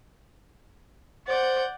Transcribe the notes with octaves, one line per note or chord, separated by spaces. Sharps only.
C5 D5 F#5 G6